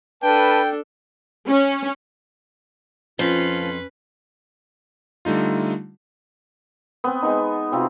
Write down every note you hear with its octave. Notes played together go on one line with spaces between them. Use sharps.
D4 A4 B4 G5 A5
C#4
F2 F3 C#4 F4 B4 C6 C7
D3 G3 A3 D#4 F4
B3 C4
G#3 B3 D#4
C3 C4 F4 F#4